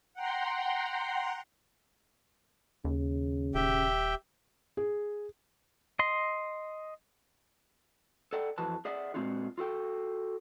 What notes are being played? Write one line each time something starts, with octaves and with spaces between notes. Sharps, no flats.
F#5 G5 A#5 C6
D#2 C#3
D#1 G4 E5 G5
G#4
D#5 C6
A4 D5 F#5 G5
F2 E3 F#4 B4 A5
G#4 D5 E5 F#5
A#2 G#3 C4 D4 F4 F#4
F4 F#4 A4 G5